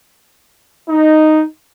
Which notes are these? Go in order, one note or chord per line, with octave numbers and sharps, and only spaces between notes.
D#4